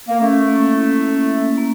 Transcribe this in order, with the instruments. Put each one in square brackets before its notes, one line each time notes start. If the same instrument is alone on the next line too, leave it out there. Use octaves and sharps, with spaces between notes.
[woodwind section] A#3
[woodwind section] A3 [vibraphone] C#4
[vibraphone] A#3
E4
C#4
A#3
A#3